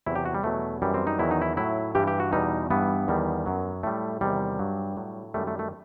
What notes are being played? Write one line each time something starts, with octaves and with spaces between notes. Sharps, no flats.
E2 C3 F#3 E4
G4
F#4
G3
E2 B2 F#3 A3
F#2 E3 G3
C4
D#4
E2 D#3 F#3 E4
D#4
E4
A2 F#3 E4
G2 E3 G3 G4
G4
F#4
E2 B2 G3 D#4
G2 E3 G3 B3
E2 D#3 G3
F#2 F#3
A2 G3 A3
E2 C3 D#3 G3
G2 F#3
A2 F#3
F#2 D#3 G3 A3
A3
A3